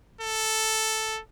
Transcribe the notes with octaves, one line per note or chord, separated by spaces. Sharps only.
A4